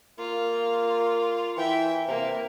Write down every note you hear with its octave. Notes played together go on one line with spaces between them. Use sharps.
A#3 F4
E3 E5 G5
C3 A#3